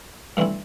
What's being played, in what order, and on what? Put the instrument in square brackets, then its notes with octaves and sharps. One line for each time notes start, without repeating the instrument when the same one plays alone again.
[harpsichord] G2 E3 A3 C4 E4